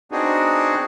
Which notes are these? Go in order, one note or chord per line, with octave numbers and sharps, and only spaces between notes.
B3 C4 D4 D#4 F#4 G#4